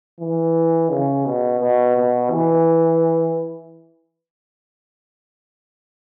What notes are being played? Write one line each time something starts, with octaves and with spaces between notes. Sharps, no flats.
E3
C#3
B2
B2
B2
E3